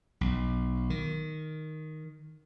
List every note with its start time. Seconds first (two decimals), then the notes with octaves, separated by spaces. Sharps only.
0.21 B1
0.90 D#3